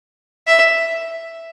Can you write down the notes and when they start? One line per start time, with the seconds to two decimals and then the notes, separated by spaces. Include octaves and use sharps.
0.47 E5